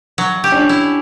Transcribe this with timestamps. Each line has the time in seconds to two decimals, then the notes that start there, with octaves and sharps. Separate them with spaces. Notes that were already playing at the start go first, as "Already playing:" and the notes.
0.18 F#3
0.44 G4
0.52 C#4
0.56 D4
0.69 E4